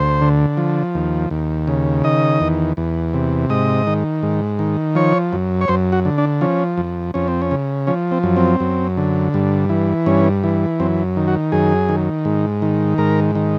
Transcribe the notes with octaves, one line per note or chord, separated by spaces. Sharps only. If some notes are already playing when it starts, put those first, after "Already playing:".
Already playing: D2 C5
D3
F3
D#2
D#2
C#3
D#3 D#5
E2
E2
C3
G#2 D#5
D#3
G#2
D#3
F3 C#5
F#2
C#5
F#2 C5
F#4
D3
D4
F3 C#4
F2
F2 C#4
C4
C#4
C#3
F3 C#4
C4
F#2
C4
F#2
D3
G2
E3
G2 C#4
E3
F#2 C4
D#3
F#4
F#2 G#4
D#3
G#2
D#3
G#2 A#4
D#3